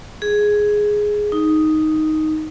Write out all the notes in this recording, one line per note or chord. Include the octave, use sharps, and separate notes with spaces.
G#4
D#4